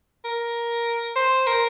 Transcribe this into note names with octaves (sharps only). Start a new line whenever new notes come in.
A#4
C5
A#4